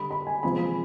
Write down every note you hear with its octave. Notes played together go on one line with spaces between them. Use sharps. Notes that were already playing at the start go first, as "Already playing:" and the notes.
Already playing: D3 G3 B5
B5
G#5
C3 F3 G#3 B5